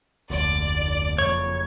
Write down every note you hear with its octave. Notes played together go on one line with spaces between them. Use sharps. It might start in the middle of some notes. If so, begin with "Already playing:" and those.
F1 D2 D5
F#1 F2 C#5